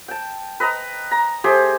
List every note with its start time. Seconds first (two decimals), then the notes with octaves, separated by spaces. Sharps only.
0.08 G5 A5
0.60 B4 D#5 A#5
1.11 A#5
1.44 A3 G4 G#4 C5